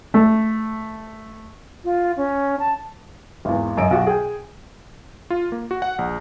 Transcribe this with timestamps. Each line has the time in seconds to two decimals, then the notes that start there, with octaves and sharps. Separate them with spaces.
0.14 A3
1.84 F4
2.17 C#4
2.59 A5
3.45 G#1 E2
3.77 F#2 D#5 D7
3.91 B1 F#4 G4
4.07 G#4 G5
5.30 F4
5.52 A#3
5.71 F#4
5.82 F#5
5.99 A#1